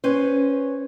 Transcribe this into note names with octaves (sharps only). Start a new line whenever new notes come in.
C#4 B4 C5